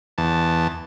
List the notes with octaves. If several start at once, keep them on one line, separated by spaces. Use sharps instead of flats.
E2 A5